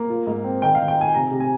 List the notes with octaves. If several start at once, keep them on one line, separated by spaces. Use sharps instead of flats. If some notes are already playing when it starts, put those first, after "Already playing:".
Already playing: A#3
F4
G#2
C4
D#3 G5
D#3 F5
G5
D#4 G#5
C3 A#5
C3
G#5